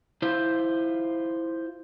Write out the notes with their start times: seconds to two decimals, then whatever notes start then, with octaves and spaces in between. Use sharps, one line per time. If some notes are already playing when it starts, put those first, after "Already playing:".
0.22 E4 F4 C5